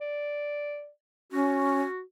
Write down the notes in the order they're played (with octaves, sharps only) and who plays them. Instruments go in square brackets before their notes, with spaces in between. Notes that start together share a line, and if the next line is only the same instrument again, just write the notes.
[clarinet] D5
[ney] C#4 [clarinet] F#4